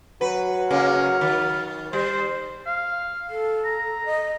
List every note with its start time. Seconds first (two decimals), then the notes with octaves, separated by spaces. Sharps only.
0.21 F#3 B4
0.71 C#3 G#3 A#3 F6
1.21 D#3
1.93 G3 C5
2.66 F5
3.30 A4
3.64 A#5
4.06 D#5